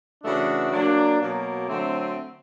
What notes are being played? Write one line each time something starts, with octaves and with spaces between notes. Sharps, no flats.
C#3 E3 A3 D4 F#4
F#3 A#3 D4
B2 F#3 A#3
D3 F#3 A3 C4